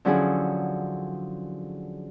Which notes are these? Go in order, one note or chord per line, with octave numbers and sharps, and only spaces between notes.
D3 F3 F#3 C#4 E4 G#4